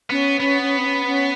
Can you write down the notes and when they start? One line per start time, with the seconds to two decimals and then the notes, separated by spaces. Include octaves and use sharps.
0.10 B3 C#4
0.40 B3 C#4
0.61 C#4
0.77 C4
0.84 C#4
1.06 C#4